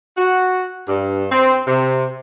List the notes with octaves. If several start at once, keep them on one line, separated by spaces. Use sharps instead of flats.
F#4
G2
C4
C3